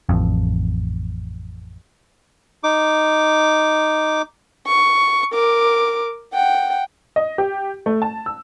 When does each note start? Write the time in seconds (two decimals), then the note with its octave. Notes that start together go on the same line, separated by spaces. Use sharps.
0.09 A1 F2
2.64 D#4 D6
4.67 C#6
5.33 A#4 D6
6.33 F#5 G5
7.16 D#5
7.38 G4
7.86 A3
8.02 A5
8.26 E6